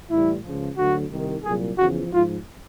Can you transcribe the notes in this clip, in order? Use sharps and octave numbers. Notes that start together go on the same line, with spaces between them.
A2 E3 G3 E4
C#2 C#3 F3
D2 D3 F#3 F#4
C2 C3 D#3
C2 A#2 F#3 G#4
E2 C#3 F3 F#4
G#2 F3 F4